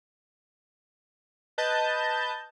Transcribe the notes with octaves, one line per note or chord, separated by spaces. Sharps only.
B4 D#5 A5 G6